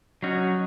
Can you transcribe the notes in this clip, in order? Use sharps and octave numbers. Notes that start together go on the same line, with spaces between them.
F#3 C#4 D#4 F#4